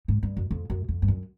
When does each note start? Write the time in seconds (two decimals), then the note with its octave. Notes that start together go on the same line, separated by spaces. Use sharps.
0.08 G#2
0.23 G2
0.37 F#2
0.51 F2
0.70 F#2
0.88 F2
1.02 G2
1.08 F#2